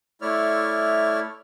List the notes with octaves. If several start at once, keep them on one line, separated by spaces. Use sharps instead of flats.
A3 E4 C#5 D5 E5 F6